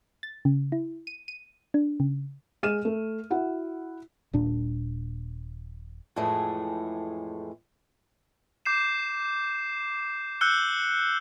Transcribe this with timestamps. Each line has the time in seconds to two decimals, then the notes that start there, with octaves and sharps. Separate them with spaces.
0.23 A6
0.45 C#3
0.72 E4
1.07 D#7
1.28 D#7
1.74 D4
2.00 C#3
2.63 G#3 F6 D#7 E7
2.85 A3
3.30 E4 F#4 F#5
4.33 D#1 A#2 D4
6.16 F2 A2 E3 G#3 A3 G#4
8.65 D6 G6 C7 E7
10.41 E6 F#6 G6 C#7 G7